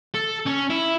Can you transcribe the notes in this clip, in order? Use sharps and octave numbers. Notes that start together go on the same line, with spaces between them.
A4
C#4
E4